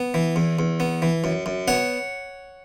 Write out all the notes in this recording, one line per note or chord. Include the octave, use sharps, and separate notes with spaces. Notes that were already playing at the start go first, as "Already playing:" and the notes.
Already playing: B3
E3
E2
E2
B3
E3
F#2
F#2
B3 C#5 F#5